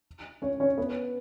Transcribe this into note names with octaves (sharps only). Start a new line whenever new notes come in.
C#4 C#5
C#4 C#5
B3 B4